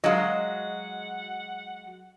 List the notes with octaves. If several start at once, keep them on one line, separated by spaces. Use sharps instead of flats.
F#3 G#3 D#5 F5 F#5